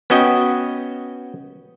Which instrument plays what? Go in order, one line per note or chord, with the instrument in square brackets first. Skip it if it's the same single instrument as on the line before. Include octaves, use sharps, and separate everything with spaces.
[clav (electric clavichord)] B3 C#4 F#4 D#5 G5